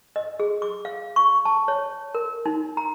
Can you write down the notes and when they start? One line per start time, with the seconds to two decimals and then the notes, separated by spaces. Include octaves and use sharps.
0.16 D#5
0.40 G#4
0.62 D6
0.85 F5
1.16 C#6
1.45 A5
1.68 C#5
2.15 A#4
2.46 D#4
2.77 A#5